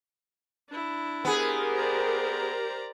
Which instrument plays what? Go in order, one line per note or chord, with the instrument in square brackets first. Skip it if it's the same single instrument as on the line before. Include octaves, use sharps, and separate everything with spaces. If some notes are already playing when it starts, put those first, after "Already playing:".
[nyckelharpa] D4 E4
[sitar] B3 G#4 [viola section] G4 A#4 C5
[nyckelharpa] D5 A#5